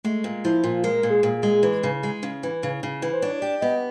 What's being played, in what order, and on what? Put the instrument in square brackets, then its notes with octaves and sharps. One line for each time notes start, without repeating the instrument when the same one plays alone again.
[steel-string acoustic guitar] G#3 [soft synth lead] A3
[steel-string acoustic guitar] A#2
[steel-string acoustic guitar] F3 [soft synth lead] E4
[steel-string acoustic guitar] A#2 [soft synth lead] F4
[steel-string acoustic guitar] G#3 [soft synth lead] A#4
[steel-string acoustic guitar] A#2
[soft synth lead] G#4
[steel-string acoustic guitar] A#2
[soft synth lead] G#4
[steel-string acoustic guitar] G#3
E3
C#3
G#3
C#3
E3
C#3
C#3
E3
[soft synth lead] C5
[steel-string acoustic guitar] D4 [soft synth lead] C#5
[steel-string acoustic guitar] G4 [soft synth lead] D5
[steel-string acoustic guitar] B3 [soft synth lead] D#5